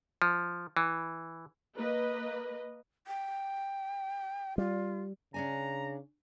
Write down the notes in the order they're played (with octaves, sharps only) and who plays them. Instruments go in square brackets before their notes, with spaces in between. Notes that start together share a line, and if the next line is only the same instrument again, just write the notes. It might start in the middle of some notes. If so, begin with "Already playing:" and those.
[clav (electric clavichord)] F3
E3
[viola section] A#3 B4 D#5
[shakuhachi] G5
[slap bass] G3 [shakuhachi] F4
[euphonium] C#3 [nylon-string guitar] C#4 D4 G#5 [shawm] A#5